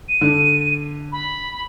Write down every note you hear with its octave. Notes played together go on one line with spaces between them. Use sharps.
D#7
D3
B5